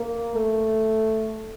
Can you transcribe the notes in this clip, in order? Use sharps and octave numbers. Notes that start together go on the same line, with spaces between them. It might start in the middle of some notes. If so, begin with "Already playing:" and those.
Already playing: A#3
A3